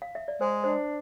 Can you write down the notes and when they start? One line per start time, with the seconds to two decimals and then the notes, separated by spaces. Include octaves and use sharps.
0.02 F5
0.15 E5
0.28 D5
0.41 G#3 C5
0.64 D4 C5